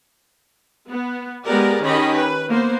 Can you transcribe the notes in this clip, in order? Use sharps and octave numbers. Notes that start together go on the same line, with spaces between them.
B3
G#3 B3 G4 G#4 A#4 D5
D#3 C#4 G4 D#5 B5
B4
A#3 B3 C5